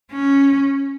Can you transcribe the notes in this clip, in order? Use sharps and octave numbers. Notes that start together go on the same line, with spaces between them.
C#4